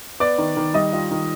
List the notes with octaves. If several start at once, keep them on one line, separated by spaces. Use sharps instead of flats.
B3 D5 D6
D#3
D#3
G3 D#5 D#6
F4
D#3